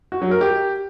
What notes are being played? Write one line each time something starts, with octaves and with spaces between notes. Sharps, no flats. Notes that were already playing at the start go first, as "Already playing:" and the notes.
F#4
F#3
A#4
G4